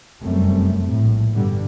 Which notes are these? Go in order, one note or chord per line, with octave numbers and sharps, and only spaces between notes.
F1 F#2 G3 A3 C4
A#1 A2
G2 B2 D3 G3